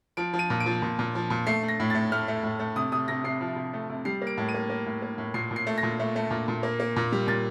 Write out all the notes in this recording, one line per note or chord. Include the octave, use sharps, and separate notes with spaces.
F3 D7
F3
D#7
A#2
D7
F3
A#2
A#2
F3
A#2
A3 C7
A3
A#6
A2
A6
A3
A3 F6
A3
A2
A3
C3 D#6
C3 D#6
C3 A#6
C3 C7
F3
C3
A3
C3
G3 C7
A#3
D7
A2
D#7
A#3
A#3
A2
A#3
A2
A#2 C7
A#2
C7
A3
A#6
A#2
A3
A3
A#2
A#2
A#3
A#3
A#2
G3
A#2 A6